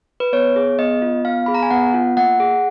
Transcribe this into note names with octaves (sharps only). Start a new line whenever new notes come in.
B4
B3 C#5
G#4
B3 D#5
F4
B3 F5
G#4 B5
A#5
G#5
B3 F#5
F4
A#3 F#5
G#4